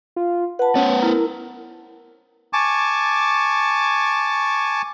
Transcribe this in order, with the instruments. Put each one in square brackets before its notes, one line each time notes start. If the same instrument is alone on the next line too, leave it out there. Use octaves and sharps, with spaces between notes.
[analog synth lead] F4
[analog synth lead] B4 [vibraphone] F#5 A5
[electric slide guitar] B3 B4 C5 [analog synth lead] C#4
[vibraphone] E4 [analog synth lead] A#4
[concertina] G#5 A5 C#6 D6